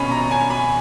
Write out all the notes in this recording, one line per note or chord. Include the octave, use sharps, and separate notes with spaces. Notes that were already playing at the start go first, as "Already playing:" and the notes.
Already playing: B2 C#4 B5
A#5
C#4 G#5
B5